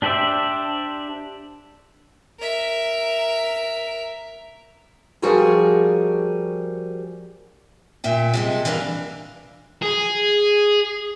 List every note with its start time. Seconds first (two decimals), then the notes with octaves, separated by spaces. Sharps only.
0.02 D4 G4 C5 D5 E5
2.40 A#4 E5
5.22 F3 G3 F#4 G#4 A#4 G#5
8.04 A#2 E5 G5
8.34 C3 F3 G#3
8.65 E3 D4 A#4 D#5 F5
9.82 G#4